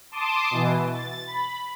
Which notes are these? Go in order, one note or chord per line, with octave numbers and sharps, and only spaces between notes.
A5 C6 D6 D#6
B2 E3
A6
B5